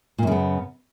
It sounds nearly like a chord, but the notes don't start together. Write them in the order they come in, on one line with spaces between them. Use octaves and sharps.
A#2 F#2 C#3 B3